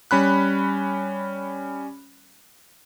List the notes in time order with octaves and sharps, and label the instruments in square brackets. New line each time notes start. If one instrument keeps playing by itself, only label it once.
[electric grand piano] G3 C#4 B5 F#6